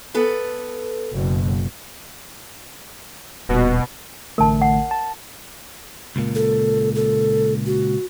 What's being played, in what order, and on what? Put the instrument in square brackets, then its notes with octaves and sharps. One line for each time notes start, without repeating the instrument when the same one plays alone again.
[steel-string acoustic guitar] B3 A4 B4
[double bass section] F#1 B2
[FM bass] D#1 [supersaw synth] B2
[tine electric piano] A1 D3 A3 [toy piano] A#4 A5
[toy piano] F#5
[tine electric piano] A5
[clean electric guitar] C#2 A#2
[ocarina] A4
A4
F#4